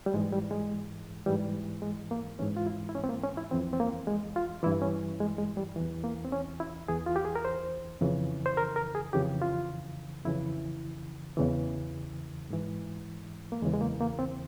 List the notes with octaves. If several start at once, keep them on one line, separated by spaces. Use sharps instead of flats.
G3
G#2 E3 G#3
G3
G#3
G#2 E3 G3
G#3
A#3
G#2 E3 C#4
F4
E4
E4
C#4
C4
A#3
C#4
E4
F2 E3 C4
C4
A#3
G#3
F4
G2 E3 E4
C#4
G#3
G#3
G3
E2 E3
A#3
C4
C#4
E4
E2 E3 G#4
F4
G4
G#4
A#4
C5
F2 C#3 E3
C5
A#4
A#4
G#4
F2 C#3 E3 G4
F4
F2 C#3 E3 E4
E2 C#3 E3
G#2 E3
A#3
E2 C#3 E3 G#3
G#3
A#3
A#3
C4